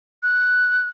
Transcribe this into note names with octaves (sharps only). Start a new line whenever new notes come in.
F#6